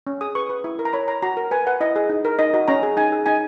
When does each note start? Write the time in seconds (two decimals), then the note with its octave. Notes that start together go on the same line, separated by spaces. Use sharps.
0.07 C#4
0.21 G#4 D#6
0.35 B4 C#6
0.49 B4
0.64 E4
0.79 A#4
0.85 A#5
0.93 C#5 B5
1.08 C#5 A#5
1.22 F#4 A#5
1.37 A#4
1.51 B4 G#5
1.67 B4 F#5
1.81 E4 D#5
1.96 G#4
2.09 D#4
2.25 A#4
2.39 D#4 D#5
2.54 F#4 D#5
2.68 C#4 A#5
2.83 G#4
2.97 D#4 G#5
3.12 G#4
3.26 D#4 G#5